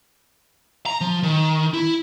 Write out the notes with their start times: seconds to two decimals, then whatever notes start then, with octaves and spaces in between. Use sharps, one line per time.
0.86 A#5
1.01 F3
1.23 D#3
1.74 E4